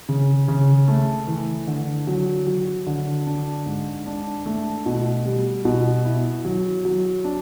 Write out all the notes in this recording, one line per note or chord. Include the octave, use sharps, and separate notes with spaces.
C#3
C#3
A3
E3
D3
F#3
F#3
D3
D4
G#2
D4
A3
B2
G3
B2
E4
F#3
F#3
D4